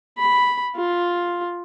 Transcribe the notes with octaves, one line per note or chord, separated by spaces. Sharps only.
B5
F4